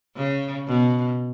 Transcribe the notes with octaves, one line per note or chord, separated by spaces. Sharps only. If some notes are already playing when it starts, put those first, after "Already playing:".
C#3
B2